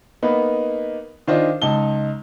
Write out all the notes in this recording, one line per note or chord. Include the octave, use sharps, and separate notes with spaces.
A#3 B3 D#4 B4
D#3 D4 F4 C5 D5 D#5
C#2 D#4 A5 G7